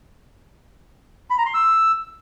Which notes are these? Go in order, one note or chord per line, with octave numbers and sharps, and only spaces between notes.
B5
A#5
C6
E6